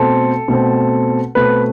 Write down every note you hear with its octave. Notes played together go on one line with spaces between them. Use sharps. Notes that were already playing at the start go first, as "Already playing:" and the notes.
Already playing: B2 A3 C4 A4
B2 A3 C4
B2 A3 C4 B4